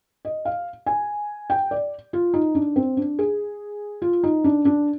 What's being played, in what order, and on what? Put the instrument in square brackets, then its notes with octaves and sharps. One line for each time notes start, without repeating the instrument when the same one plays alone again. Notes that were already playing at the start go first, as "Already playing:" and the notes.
[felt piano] D#5
F5
G#5
G5
D5
F4
D#4
D4
C4
D4
G#4
F4
D#4
D4
D4